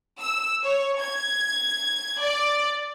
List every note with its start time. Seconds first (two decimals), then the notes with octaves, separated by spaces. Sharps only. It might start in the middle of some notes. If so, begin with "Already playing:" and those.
0.21 E6
0.63 C#5
1.00 G#6
2.21 D5